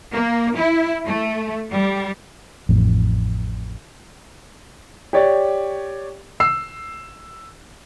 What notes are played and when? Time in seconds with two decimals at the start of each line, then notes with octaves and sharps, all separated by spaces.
0.13 A#3
0.57 E4
1.06 A3
1.71 G3
2.69 A1 F2 A2
5.13 G4 C#5 D5
6.40 E6 C7